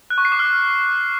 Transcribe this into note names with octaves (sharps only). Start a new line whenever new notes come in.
F#6
C#6
C7
D6
F6